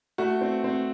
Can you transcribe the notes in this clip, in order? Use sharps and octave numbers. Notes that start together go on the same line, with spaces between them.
A3 F#4
C4
C4